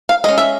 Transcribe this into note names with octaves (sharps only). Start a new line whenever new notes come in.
F5
G#3 C#4 D#5
E5